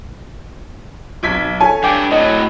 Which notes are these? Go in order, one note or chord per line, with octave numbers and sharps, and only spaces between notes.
B1 G#6 B6
A4 C#5 G#5
G2 D4 G5 D6
A2 F#3 D#5